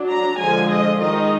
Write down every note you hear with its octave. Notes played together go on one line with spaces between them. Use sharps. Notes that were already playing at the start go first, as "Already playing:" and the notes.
Already playing: F#3 D4
A#5
D3 F3 G#3 G#5
D#5
D#3 G#3 D#4 D#5